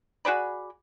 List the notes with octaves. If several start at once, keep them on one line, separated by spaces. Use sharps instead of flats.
F#4 G#4 D5 B5